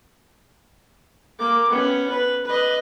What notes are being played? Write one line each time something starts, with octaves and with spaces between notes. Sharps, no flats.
A#3 D6
B3 C#4
B4
B4 D#5